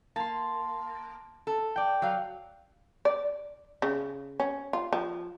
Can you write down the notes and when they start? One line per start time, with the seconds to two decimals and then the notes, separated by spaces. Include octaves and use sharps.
0.16 A#3 A5 C6
1.47 A4
1.76 D5 G5
2.02 F#3 F5
3.05 D5
3.82 C#3
4.40 C#4
4.73 F4
4.93 F3